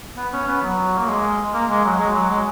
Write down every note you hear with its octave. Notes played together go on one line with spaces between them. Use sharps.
B3
C#4
B3
F#3
A#3
G#3
A#3
G#3
F#3
G#3
F#3
G#3